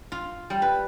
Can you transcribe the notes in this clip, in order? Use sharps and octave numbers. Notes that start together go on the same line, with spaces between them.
F4
G3
B4